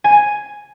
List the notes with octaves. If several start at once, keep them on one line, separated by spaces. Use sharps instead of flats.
G#5